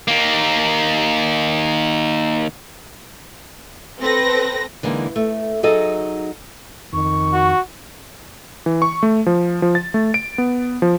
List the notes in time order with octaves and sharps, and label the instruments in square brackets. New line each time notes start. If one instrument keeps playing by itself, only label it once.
[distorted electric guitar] D#3 A#3
[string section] C4 A4 B4 A#6
[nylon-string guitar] D3 E3 G#3 A#3 D#4
A3
F#3 D#4 G#4 A4 D#5
[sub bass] F2 [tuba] D#3 [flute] C#6
[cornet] F#4
[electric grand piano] E3
C#6
A3
F3
F3
A6
A3
D7
B3
F3